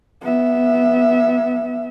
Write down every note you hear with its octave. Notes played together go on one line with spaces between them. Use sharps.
B3 E5